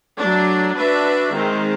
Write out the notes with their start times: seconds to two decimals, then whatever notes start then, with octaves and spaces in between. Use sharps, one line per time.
0.19 F#3 A3 D4
0.76 D4 F#4 B4 E5
1.33 D#3 G#3 C4